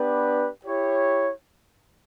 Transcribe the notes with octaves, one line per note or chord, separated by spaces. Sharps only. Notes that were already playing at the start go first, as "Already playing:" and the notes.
Already playing: B3 D4 G4 B4 D5
E4 G4 C#5